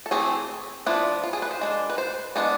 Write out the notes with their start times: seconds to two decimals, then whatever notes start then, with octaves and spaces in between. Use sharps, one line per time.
0.06 A4
0.11 E3 A3 C4 G#4
0.86 F3 B3 D4 E4
1.24 F4
1.33 G#4
1.42 B4
1.51 C5
1.61 G#3 D4
1.90 B4
1.98 C5
2.36 G#3 B3 D4